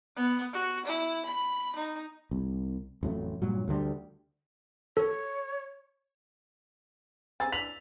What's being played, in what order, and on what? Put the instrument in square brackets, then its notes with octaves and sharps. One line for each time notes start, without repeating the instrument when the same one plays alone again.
[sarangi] B3
F#4
E4
B5
D#4
[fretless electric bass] C2
A1 F2 F#3 A3
G2 A#2 F#3
D2 D3 G3
[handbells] A4 [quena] C#5
[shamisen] C4 G#4 G#5 [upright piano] A#5 E6 A6
[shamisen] E3 D4 [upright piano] B6 F7 F#7